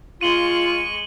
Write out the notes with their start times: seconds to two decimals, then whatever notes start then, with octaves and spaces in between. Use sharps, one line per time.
0.21 G#3 F4 C#6 D#7 F#7 G7